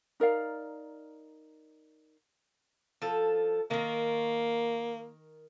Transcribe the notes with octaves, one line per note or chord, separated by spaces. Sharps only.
D#4 A#4 D5 F5
F3 A4
D#3 A#3 A#4